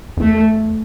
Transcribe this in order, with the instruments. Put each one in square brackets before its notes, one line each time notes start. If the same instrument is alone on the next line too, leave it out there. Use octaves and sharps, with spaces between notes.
[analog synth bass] F2
[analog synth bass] E2 [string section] A3